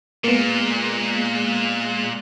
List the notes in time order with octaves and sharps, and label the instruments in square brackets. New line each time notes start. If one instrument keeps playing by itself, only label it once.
[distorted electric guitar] A#2 [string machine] G#3 F#6 [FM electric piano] A#3 B3